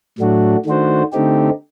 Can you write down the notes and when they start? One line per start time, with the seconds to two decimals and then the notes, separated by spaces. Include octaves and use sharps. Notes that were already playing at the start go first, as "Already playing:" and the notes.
0.18 A2 F#3 A3 D4 F#4
0.65 D#3 A3 D4 F#4 C5
1.12 D3 A3 C4 D#4 G4